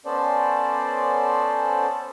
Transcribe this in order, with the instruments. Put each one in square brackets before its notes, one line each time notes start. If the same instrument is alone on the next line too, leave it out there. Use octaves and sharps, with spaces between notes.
[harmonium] B3 C#4 A4 C5 D5